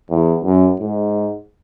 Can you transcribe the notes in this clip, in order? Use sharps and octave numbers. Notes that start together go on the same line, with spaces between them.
E2
F#2
G#2